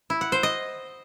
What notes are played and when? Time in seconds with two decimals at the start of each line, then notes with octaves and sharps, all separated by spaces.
0.10 E4
0.21 F#5
0.32 C5
0.43 D#5